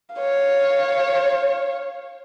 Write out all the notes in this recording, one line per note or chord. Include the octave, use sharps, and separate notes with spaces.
C#5 F5